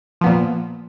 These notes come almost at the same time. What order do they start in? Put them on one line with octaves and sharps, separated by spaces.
F3 B3 A#2